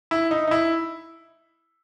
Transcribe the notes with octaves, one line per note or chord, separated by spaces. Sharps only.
E4
D#4
D#4
E4